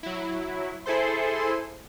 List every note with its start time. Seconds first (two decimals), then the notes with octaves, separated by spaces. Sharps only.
0.03 F#3 E4
0.86 E4 G#4 A4 C5 C6